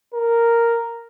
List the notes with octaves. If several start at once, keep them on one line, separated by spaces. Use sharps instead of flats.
A#4